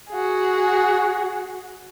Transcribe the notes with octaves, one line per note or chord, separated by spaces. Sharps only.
F#4 G#4